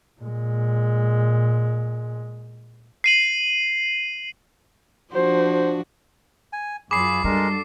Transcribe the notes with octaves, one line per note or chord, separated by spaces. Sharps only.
A#2 G#3
C7 D#7 F#7
F3 D4 F#4 C5
G#5
F#2 F#3 F4 G#4 B5 D6 C7
G3 G#3 D4 F#4 A4 A#4